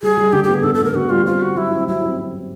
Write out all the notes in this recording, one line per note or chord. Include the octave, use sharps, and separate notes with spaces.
G3 G#4
G3
D3 G4
B3 G4
G#4
D3 A4
A4
B3 A#4
D3 F#4
G3 F4
C4 F4
C4 F#4
F#3 E4
C4
F#3 E4
C4
C4
C4